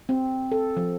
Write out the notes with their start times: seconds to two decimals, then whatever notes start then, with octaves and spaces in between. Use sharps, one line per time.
0.09 C4
0.52 A4
0.77 F3